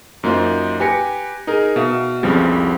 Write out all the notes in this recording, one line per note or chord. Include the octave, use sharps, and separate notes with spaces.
F#2 A#3 D#4 F4 C5
G4 B4 G#5 A#6 C#7
D#4 G#4 A#4
B2 E5 F5
C2 F2 C#3 F3 G3 B3